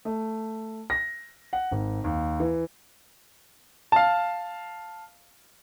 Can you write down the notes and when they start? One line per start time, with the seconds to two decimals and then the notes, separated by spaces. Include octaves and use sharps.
0.05 A3
0.90 A#6
1.53 F#5
1.71 G#1
2.04 D#2
2.40 E3
3.92 F5 A5